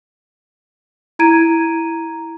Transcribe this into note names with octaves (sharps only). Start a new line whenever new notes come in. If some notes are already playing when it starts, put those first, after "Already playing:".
E4 A#5 G#6 D7 D#7